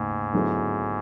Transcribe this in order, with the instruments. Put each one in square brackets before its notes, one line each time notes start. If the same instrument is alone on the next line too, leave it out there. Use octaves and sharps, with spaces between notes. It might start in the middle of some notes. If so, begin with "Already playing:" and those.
Already playing: [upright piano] D#2 C#3 A3 [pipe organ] G#2
[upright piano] D3 F#3 B3 E4 G#4